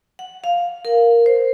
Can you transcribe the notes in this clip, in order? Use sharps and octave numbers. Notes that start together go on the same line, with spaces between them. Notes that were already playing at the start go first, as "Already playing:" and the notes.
F#5
F5
A#4
C5